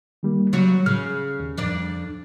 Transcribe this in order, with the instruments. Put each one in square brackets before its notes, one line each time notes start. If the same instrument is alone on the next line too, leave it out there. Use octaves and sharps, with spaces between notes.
[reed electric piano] D#3 G3 A#3
[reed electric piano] C#3 [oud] F#3 G3 F#4
[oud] C#3 [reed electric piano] F6
[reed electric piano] D#2
[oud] F2 D4 D5